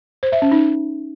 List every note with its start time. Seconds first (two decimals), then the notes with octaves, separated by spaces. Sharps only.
0.23 C5
0.32 E5
0.42 C#4
0.52 D#4